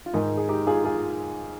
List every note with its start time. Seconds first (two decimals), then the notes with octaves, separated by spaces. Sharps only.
0.06 F4
0.14 G#2 D#3 G#3 D#4
0.37 G#4
0.49 D#4 G4
0.67 F4 G#4
0.84 F4 G#4